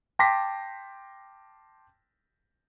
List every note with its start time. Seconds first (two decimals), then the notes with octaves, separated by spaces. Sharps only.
0.19 G5 A5 C6 D6 A#6 B6